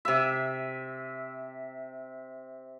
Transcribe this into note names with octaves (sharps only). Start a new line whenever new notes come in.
C3 E5